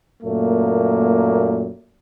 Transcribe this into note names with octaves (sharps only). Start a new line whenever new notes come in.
F#2 A#2 A3 A#3